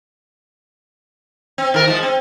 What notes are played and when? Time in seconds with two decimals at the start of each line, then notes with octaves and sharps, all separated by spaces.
1.58 C4
1.74 D#3 A#4
1.88 F3 G#3
2.03 C4